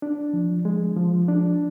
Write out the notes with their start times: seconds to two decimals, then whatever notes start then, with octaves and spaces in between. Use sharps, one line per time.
0.02 D4
0.33 F3
0.65 G#3
0.96 F3
1.28 D4